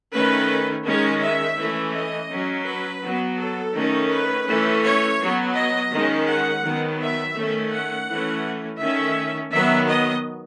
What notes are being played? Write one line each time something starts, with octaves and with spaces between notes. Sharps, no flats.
D#3 A3 C#4 B4
D#3 G#3 C#4 C#5
E5
E3 A3 C#4
D#5
F#3 C#4
B4
F#3 B3
A4
D#3 A3 C#4
B4
E3 A3 C#4
C#5
F#3 B3
D#5
D#3 G#3 C#4
F#5
D#3 F#3 B3
E5
D#3 A3 C#4
F#5
E3 A3 C#4
D#3 A3 C#4 E5
D#3 F#3 B3 E5
D#5